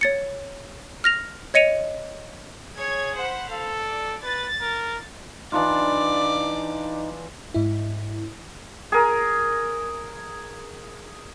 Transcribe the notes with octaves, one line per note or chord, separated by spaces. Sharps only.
C#5 A6 C#7
F6 A#6 F7
C#5 D#5 C#7 D#7 F7
G#4 C#5 G#6
C5 F#5 B5
A4 F5
D5
B4 A6
A#4
E3 D4 D#4 F4 D5
G#2 E4
G#4 A#4